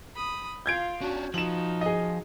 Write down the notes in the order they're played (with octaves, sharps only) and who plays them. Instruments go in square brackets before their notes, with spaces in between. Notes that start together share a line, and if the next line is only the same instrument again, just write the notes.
[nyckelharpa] B5 D#6
[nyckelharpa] F4 F5 [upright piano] G6 G#6 D7
[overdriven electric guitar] C#4 D4 [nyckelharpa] F#4
[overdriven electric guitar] F3 [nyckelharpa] D#4 F#4 [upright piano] E7 F#7
[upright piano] G#4 D#5